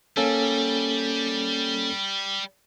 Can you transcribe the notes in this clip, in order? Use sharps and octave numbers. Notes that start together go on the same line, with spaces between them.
G3 A#3 C#4 A4